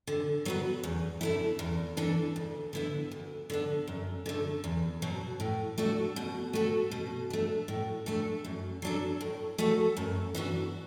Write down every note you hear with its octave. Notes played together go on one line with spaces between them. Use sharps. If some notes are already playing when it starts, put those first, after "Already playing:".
D3
F#3 B3 F#4 B4
E2
D3 A3 E4
E2
E3 D4 A4
D2
D3 B3 E4
D2
D3 B3 D4
F#2
D3 A3
E2
B2 F#3
A2
A3 D4 F#4
B2
A3 F#4 A4
B2
A3 D4
A2
A3 D4 A4
F#2
F#3 D4 A4
A2
A3 F#4 A4
F#2
E3 B3 D4 F#4